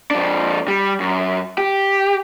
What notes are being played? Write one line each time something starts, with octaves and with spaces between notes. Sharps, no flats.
F2 D4
G3
F#2
G4